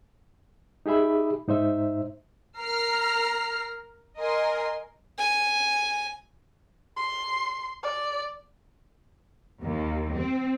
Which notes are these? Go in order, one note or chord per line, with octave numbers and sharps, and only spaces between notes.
D#4 G4 G#4 E5 B5
G#2 D#4 C5 E5
A#4 A#5 F6 C7
A#4 D#5 G#5 C6
G#5
C6
D5
D#2
C4